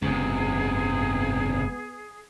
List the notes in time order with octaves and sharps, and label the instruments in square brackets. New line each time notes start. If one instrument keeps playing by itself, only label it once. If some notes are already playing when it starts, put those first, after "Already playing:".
[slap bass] F#1 C#2 [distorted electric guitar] G#2 C3 [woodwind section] B3 [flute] G#4